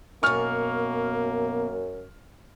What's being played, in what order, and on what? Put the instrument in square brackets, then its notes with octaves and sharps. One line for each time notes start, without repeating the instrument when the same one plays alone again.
[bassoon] F#2 [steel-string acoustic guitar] B2 G#5 [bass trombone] A#3 [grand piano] C#6 F6